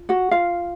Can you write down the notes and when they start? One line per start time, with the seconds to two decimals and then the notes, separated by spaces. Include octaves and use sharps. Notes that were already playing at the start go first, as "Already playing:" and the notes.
Already playing: F4
0.09 F#4 F#5
0.31 F4 F5